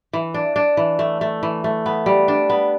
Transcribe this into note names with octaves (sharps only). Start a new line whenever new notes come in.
E3
D4
D4
E3
A3
A3
E3
A3
B3
G3
D4
B3